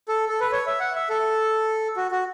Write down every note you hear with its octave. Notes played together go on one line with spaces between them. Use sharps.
A4
A4
B4
C#5
E5
F#5
E5
A4
F#4
F#4